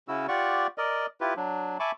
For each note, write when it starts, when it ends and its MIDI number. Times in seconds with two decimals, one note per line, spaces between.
0.08 0.27 49
0.08 0.27 61
0.08 0.27 64
0.08 0.27 66
0.08 0.27 88
0.28 0.67 65
0.28 0.67 67
0.28 0.67 74
0.28 0.67 78
0.28 0.67 85
0.78 1.06 70
0.78 1.06 74
0.78 1.06 75
1.21 1.34 64
1.21 1.34 65
1.21 1.34 67
1.21 1.34 71
1.37 1.77 54
1.37 1.77 62
1.80 1.91 76
1.80 1.91 80
1.80 1.91 81
1.80 1.91 83
1.80 1.91 85
1.80 1.91 86